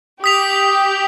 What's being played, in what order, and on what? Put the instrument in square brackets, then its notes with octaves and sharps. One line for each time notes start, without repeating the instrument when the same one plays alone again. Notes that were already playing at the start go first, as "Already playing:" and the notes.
[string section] G4 [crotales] D#6 B6 F7